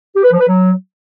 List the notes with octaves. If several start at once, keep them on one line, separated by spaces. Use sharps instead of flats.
G4
B4
F3
B4
F#3